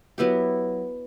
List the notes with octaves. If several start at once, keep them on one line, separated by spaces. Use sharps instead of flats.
F#3 B3 E4 G4